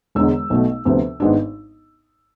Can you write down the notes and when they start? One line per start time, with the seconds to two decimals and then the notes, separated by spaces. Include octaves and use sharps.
0.15 E1 E2 D3 G#3 E6
0.50 B1 B2 A3
0.85 D2 C3 F3 B3
1.20 G#1 G#2 G#3 B3 D4